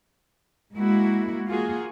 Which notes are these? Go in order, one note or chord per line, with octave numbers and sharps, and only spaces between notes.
G#3 A#3 E4 F#4
A#3 F4 F#4 G#4